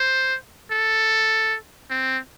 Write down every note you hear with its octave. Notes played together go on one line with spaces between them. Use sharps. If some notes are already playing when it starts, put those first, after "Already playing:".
Already playing: C5
A4
C4